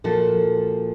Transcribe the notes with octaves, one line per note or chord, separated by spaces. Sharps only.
A#2 F3 F#4 A4